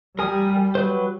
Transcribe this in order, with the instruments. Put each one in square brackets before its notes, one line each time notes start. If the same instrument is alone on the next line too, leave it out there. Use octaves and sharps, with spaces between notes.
[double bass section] G3 [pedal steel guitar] A#4 G#5 D#6
[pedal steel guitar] F#3 B4 C5